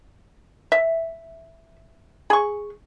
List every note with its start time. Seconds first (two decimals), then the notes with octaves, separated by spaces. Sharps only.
0.72 E5
2.30 G#4 C#6